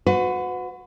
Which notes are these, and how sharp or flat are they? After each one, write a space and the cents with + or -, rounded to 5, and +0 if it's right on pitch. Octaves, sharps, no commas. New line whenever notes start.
F#4 -20 B4 +35